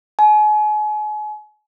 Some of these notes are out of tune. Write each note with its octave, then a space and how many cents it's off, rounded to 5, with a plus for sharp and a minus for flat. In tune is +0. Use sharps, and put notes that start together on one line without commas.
G#5 +35